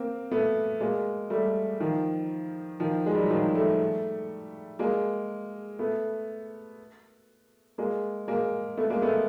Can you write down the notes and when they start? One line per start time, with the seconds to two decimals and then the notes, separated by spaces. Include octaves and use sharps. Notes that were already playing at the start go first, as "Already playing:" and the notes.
Already playing: A#3 C4
0.31 A3 B3
0.81 G#3 A#3
1.30 G3 A3
1.80 D#3 F3
2.80 D#3 F3
3.06 G#3
3.15 G3
3.22 F#3
3.30 D#3 F3
3.55 G3 A3
4.79 G#3 A#3
5.79 A3 B3
7.78 G#3 A#3
8.28 G#3 A#3
8.77 A3 B3
8.90 G#3 A#3
9.02 A3 B3